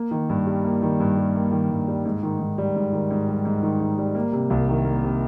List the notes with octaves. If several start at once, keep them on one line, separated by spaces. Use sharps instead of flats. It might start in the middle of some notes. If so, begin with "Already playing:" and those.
Already playing: A#3
D#3
G2
G3
A#3
D#3
G2
G3
A#3
D#3
G2
G3
G#2
D#3
G#2
G3
G#2
D#3
G#2
G3
G#2
D#3
G#2
G3
A#3
C3
C2
D#3
A#3
C3